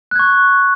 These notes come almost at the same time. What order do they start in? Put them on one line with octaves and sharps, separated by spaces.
F#6 G#6 C#6